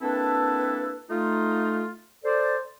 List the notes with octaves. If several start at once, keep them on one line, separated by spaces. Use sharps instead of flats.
A#3 C4 D4 E4 A4 B4
A3 D#4 F4
A4 C5 D5